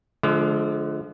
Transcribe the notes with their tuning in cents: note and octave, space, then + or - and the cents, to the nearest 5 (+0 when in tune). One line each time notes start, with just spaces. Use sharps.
D3 +0 F3 +0 G#3 +40